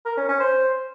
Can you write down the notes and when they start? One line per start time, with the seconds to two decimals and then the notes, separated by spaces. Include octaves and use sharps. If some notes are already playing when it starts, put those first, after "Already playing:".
0.05 A#4
0.17 C#4
0.28 C#4
0.40 C5